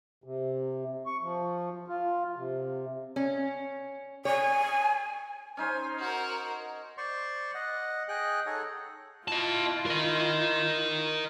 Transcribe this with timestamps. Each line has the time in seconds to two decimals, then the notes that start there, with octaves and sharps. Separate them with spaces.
0.24 C3
1.06 C#6
1.22 F3
1.88 F4
2.37 C3
3.16 C#4
4.25 C#5 G#5
5.57 C#4 D#4 C5 G#5
5.99 F#4 A#4
6.97 C5 D5 C6 C#6
7.54 D#5 F#5
8.09 G#4 D#5 G5 F#6
8.46 D#4 G#4 A4 C#5 D#5 F#5
9.28 E4 F4 D#5 A5
9.86 A#4 D#5